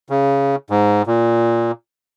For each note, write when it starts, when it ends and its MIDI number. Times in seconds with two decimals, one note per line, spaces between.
0.10 0.56 49
0.70 1.02 44
1.07 1.72 46